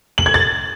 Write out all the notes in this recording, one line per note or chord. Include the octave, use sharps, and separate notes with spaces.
F#7
G#6
A6